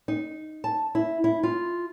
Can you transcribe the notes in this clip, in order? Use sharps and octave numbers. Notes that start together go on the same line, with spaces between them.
D#4
A5
E4
E4
F4